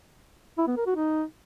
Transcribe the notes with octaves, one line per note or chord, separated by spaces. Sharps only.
E4
B3
A#4
F#4
D#4